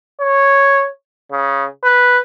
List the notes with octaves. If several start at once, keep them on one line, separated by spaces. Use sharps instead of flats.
C#5
C#3
B4